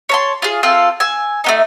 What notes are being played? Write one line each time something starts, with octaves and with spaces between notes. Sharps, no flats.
C#5 A5 C6
F4 G#4
C4 F4 A4
G#5 E6
A3 B3 D#4